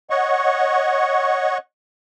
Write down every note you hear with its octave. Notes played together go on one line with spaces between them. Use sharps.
C#5 D#5 F#5 C#6